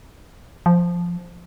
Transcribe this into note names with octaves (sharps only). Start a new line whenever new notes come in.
F3